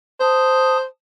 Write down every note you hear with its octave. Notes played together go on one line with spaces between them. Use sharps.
C5 A5 D#6